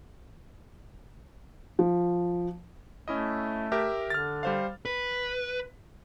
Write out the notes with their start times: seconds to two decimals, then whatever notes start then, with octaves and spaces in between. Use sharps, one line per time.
1.79 F3
3.08 A3 C#4 E4 D#5
3.72 G4 A#4 E5
4.10 D3 F6 A6
4.43 G3 C5 F5
4.85 B4